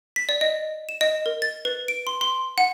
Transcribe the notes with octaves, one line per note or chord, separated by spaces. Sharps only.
B6
D5
D#5
E7
D#5
A#4
A6
B4
D7
C6
C6
F#5